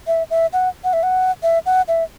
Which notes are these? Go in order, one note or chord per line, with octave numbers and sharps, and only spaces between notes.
E5
E5
F#5
F#5
E5
F#5
E5
F#5
E5